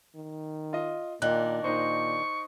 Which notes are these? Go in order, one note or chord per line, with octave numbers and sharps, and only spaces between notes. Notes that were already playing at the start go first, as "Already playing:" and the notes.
D#3
F4 D#5
A#2 D#3 D4 F#6
A#2 D#4 C5 C#6